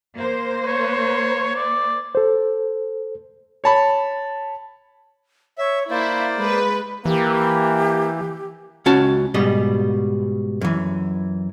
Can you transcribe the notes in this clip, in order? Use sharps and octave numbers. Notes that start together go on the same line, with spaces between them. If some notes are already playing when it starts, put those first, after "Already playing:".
A#3 C5
C#5
D5
A4 C5
C#5 A5 B5
C#5 E5
A#3 E4 C5 D5 F5
G#3 B4 B5
E3 A#3 G4
C#2 C#4 F#4 A5
G#2 B2 G3 D#5
F#2 E3